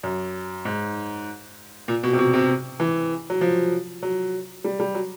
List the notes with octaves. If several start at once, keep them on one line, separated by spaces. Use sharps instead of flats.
F#2
G#2
A#2
B2
C3
B2
C3
E3
F#3
F3
F#3
G3
G3
F#3